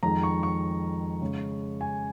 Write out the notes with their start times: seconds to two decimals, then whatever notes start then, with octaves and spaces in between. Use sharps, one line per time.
0.03 F2 D#3 G#3 A#5
0.23 C#6
0.43 C#6
1.21 C#3 G#3
1.81 G#5